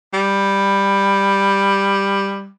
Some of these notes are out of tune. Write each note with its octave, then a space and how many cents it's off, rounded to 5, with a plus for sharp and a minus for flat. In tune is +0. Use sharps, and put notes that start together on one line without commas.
G3 +10